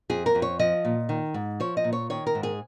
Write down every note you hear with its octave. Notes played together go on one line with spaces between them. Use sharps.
F2 G#4
A#4
F2
C#5
F3 D#5
A#2
D#3
G#2
F3 C#5
D#5
A#2
C#5
D#3 C#5
A#4
G#2
G#4